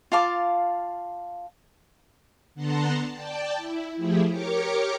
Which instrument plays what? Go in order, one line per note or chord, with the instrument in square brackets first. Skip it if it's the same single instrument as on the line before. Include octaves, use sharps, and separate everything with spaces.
[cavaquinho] F4 F5 A5 D6
[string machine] D3 B3 F#5 A5 A#5 C6
D5 G5 A5
E4
F3 A3 E4 G4 G#4
G4 A#4 C#5 C#6 D6